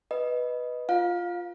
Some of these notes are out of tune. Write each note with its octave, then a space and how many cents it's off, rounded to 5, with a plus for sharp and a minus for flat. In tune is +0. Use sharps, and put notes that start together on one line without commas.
B4 -5 D#5 +0
F4 +0 F5 +20